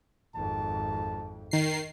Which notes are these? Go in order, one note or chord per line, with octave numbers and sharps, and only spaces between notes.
G#1 F2 A5
D#3 C7